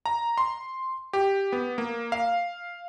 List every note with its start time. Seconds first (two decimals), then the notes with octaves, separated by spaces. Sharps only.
0.06 A#5
0.38 C6
1.13 G4
1.52 B3
1.78 A#3
2.12 F5